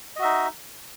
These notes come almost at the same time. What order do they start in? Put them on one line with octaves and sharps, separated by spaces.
D#5 F#4 E5 D#4